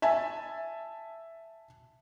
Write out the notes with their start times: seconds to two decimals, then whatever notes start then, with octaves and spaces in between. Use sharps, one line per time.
0.02 E5 G#5 A5